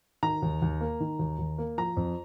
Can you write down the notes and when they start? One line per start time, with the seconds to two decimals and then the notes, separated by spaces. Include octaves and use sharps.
0.23 D#3 A#5
0.42 D#2
0.62 D#2
0.81 A#3
1.00 D#3
1.19 D#2
1.39 D#2
1.58 A#3
1.78 F3 A#5
1.97 F2